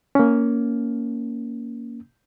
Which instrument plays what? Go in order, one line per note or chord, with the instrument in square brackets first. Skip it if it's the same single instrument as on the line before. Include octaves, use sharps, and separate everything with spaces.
[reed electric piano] A#3 C#4